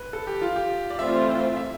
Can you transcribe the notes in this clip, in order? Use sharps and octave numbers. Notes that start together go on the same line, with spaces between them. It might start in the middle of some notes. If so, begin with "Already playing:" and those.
Already playing: B4
A4
G4
F4
G4
D5
E3 A3 C4 F4 C5 E5
E5